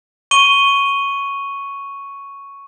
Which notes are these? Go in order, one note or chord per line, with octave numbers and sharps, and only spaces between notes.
C#6 D#7 G7